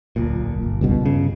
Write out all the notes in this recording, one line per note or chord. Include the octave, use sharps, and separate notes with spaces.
D1 B1 A#2
G1
C#2 G2 B2
C#3